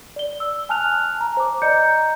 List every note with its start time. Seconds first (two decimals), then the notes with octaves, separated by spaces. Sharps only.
0.16 D5 G7
0.40 E6
0.69 G#5 A5 F6 F#6 F7
1.21 A#5
1.37 C5 D6
1.62 D5 D#5 A#5 G6 C#7